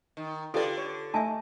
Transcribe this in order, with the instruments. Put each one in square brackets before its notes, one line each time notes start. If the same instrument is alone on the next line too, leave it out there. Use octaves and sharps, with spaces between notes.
[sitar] D#3
[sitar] D3 D5 [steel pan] F4 G4 B4 [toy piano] A4
[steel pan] C#5
[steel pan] A3 D#4 [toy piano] E5 G#5 A5